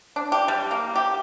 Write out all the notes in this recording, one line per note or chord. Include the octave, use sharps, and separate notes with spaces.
D4
G4
G3
A#3
G4